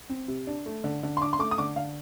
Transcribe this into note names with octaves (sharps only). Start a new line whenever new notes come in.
C4
C3
D4
A3
D3
D3
C6
D4 D6
C6
A3 D6
D#6
D3 D6
D3 F5